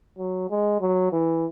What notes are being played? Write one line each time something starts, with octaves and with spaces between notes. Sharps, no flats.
F#3
G#3
F#3
E3